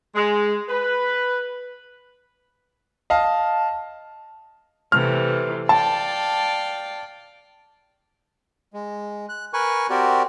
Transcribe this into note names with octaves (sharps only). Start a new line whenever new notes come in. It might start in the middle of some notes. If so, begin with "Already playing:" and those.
G#3
B4
D#5 F5 A5
C3 E3 A3 F6
D5 F5 G5 A5
G#3
F#6
A#4 B4 G#5 C#6 F#6
C4 F#4 G4 A#4 D5